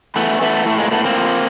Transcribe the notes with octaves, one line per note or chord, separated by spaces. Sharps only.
E3 A3 B3
E3 A3 B3
A2 A3
G#3 A#3
A2 A3 B3
A#3 C4
F3